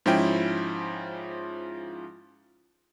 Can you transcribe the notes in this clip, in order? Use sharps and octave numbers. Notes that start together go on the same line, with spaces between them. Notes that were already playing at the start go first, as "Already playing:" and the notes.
G#2 F3 C#4 E4 G5